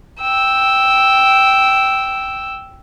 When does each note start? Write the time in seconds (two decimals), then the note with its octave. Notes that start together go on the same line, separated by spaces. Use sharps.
0.21 G5 E6